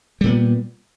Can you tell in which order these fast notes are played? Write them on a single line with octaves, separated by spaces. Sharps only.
G3 A#2 B3